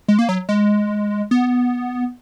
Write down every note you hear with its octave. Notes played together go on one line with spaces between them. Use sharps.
G#3
A#3
F#3
G#3
B3